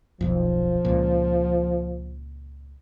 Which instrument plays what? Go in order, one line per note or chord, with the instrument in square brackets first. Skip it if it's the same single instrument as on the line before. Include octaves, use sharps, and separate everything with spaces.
[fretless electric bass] D#1 B1 F2 [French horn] F3
[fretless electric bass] C#2 A#2